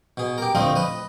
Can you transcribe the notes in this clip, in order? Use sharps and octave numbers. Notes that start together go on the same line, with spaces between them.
B2 G#4
G4 A#4
D2 F3 A3 C4 D#5 F5
B4 D#5